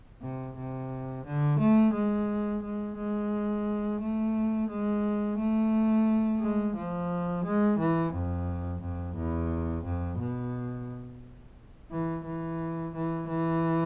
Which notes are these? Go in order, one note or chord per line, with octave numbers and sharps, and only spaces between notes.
C3
C3
D3
A3
G#3
G#3
G#3
A3
G#3
A3
G#3
F3
G#3
E3
F2
F2
E2
F2
B2
E3
E3
E3
E3